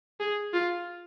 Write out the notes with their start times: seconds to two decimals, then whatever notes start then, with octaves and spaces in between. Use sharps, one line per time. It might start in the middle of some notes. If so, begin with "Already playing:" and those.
0.20 G#4
0.53 F4